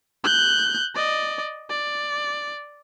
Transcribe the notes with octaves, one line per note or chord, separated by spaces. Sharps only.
F#6 G6
D5 D#5
D5